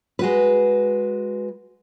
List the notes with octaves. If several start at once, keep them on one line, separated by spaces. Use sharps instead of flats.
G#3 F#4 B4